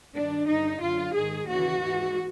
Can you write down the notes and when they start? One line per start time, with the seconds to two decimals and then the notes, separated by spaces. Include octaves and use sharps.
0.15 G2 D#3 D4
0.48 G2 D3 D#4
0.81 F#2 D3 F4
1.14 G#2 D#3 G#4
1.47 D#2 C#3 E3 F#4
1.81 G#2 E3